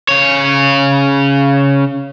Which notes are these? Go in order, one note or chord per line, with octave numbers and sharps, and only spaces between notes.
C#3 C#5